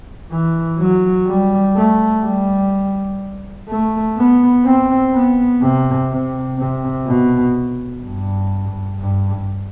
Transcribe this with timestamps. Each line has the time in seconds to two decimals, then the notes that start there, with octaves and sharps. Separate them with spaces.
0.31 E3
0.79 F#3
1.27 G3
1.75 A3
2.24 G3
3.68 A3
4.17 B3
4.65 C4
5.13 B3
5.62 C3
6.10 C3
6.58 C3
7.07 B2
8.03 G2
9.00 G2